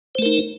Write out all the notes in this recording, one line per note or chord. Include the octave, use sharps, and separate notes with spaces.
A3 D#4 A#4 C5